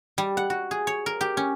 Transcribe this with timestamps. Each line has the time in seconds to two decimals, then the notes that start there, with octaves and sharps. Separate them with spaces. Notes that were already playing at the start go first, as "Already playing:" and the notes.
0.18 G3
0.37 F#5
0.50 F#4
0.71 G#4
0.87 C#5
1.06 A#4
1.21 G4
1.37 C#4